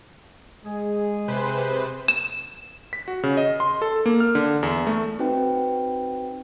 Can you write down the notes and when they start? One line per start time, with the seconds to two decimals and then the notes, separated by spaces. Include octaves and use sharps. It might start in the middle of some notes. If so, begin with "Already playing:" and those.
0.65 G#3 G#4
1.28 C3 B4 C5
2.08 E7
2.93 B6
3.08 F#4
3.23 C#3
3.37 D#5
3.60 C6
3.82 A4
4.06 A#3
4.20 F6
4.35 D3
4.63 E2
4.87 A3
5.19 C4 D#4 F#4 B4 G5